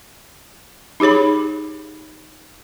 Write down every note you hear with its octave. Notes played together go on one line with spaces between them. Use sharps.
D#4 G4 G#4 C#5 B5